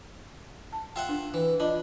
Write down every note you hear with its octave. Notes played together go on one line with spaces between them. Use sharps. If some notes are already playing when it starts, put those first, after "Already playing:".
A5
F4 E5 F#5 G5
D4
E3
D4 F4 D#5 B5